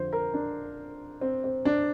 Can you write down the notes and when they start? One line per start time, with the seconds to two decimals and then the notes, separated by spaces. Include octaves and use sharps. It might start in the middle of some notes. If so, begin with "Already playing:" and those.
Already playing: F2 D3 F3 C5
0.13 A#4
0.34 D4
1.21 C4
1.44 C4
1.65 D4